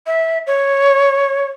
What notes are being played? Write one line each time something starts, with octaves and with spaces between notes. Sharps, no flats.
E5
C#5